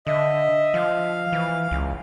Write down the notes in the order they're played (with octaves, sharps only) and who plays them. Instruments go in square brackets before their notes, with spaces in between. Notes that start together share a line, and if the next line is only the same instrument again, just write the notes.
[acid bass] D3 [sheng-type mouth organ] D#5 E5
[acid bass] F3 [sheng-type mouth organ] F5
[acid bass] E3
C#2